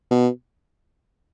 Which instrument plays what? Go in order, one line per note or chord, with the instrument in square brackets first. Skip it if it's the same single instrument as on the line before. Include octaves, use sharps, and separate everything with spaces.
[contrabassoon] B2